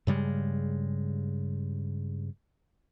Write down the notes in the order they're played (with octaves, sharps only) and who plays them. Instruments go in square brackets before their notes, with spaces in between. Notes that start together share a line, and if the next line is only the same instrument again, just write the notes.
[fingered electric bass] G2 C#3 G3 G#3